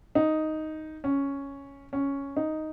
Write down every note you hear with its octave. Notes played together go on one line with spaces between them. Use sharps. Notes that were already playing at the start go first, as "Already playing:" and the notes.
D#4
C#4
C#4
D#4